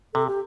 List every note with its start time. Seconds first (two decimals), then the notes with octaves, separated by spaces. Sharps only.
0.14 C3 A4
0.27 G4